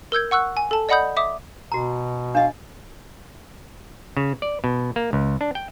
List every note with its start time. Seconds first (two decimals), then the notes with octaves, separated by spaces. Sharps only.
0.12 A#4 E6 G6 G#6
0.31 F#5 C#6 E6 F#6
0.57 G#5
0.71 A4 A5
0.89 D5 D#5 F#5 B5 D#6 G6
1.17 E5 D6 D#6
1.72 B2 F#4 A#5
2.35 D4 D#5 F5
4.17 C#3
4.42 D5
4.64 B2
4.96 A#3
5.13 C#2
5.41 D4
5.55 G5